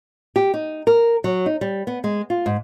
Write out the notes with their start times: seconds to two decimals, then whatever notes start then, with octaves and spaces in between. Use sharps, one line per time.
0.36 G4
0.54 D#4
0.87 A#4
1.24 F#3
1.46 D#4
1.61 G3
1.87 B3
2.04 G#3
2.30 F4
2.46 G#2